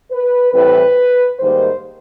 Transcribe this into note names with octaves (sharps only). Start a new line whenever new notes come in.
B4
A2 E3 G3 C4 B4
G#2 D#3 G3 A#3 C5